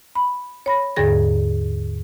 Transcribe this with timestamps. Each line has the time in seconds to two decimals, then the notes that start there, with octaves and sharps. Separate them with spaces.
0.15 B5
0.66 C#5 B5 A#6
0.96 D#2 G#2 D3 G#4 A6 A#6